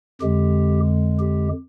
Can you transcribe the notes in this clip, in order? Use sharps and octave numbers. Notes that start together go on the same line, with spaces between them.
F2 D3 G#3 G4
G4